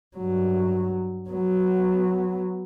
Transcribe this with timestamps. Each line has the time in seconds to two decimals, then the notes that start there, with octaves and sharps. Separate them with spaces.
0.16 G2 F#3
1.30 F#3 B3